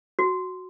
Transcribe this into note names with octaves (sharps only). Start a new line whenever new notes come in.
F#4